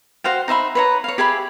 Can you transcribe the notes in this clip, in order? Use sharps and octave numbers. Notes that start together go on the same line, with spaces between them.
F#4 C5 F5 G5
D#4 C5 E5 B5
B4 C#5 A#5
C#5 F5
G4 G#4 E5 B5